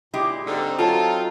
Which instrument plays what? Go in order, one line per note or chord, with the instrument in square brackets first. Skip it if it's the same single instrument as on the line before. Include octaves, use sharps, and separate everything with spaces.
[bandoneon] A#2 [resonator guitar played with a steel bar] G#3 E4 G4
[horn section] G#2 D3 G3 [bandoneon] C4 D#4
[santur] F#3 A4 [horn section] F4 [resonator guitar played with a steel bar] C#5 A5